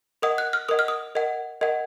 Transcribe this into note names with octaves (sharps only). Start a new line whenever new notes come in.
A#4 D#5 F#5 D#6
F#6
F6
A#4 D#5 F#5 D#6
F6
D#6
A#4 D#5 F#5
A#4 D#5 F#5